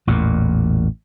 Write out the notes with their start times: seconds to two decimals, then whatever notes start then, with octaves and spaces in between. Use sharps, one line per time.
0.07 A1 E2 A#2